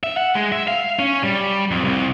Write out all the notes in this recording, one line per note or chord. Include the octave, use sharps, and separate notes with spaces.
E5
F#5
G#3
E5
F5
C#4
G3
F2
C2